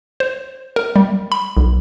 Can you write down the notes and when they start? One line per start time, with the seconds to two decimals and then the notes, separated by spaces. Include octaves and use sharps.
0.20 C5
0.76 A#4
0.96 G3
1.32 B5
1.57 B1